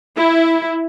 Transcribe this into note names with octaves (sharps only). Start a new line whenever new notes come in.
E4